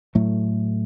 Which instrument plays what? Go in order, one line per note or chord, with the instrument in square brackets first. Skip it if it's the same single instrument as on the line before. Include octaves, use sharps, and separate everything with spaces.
[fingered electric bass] A2 F#3 A3